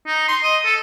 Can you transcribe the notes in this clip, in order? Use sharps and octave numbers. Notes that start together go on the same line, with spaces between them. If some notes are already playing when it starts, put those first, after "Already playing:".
D#4
C6
D#5
A4